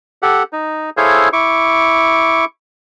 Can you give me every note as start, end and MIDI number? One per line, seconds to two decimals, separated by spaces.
0.22 0.43 67
0.22 0.43 69
0.22 0.43 78
0.53 0.90 63
0.97 1.29 64
0.97 1.29 68
0.97 1.29 69
0.97 1.29 72
0.97 1.29 73
0.97 1.29 77
1.33 2.45 64
1.33 2.45 85
1.33 2.45 86